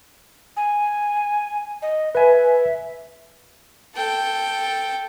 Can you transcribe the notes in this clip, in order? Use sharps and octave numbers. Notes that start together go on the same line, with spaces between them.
G#5
D#5
B4 E5 G#5
A4 G5